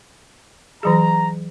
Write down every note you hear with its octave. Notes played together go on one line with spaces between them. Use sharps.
E3 F#3 G#4 A#5